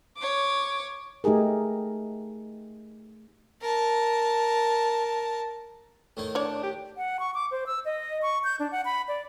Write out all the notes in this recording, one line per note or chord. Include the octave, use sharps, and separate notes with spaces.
C#5 D6
A3 D#4 G4 G#4 A#4
A#4 A5
A2 D#3 D#4
D4 C#5 D5
G4
F#5
C#6
D6
C5
E6
D#5
C#6
G6
D4
F#5
B5
D5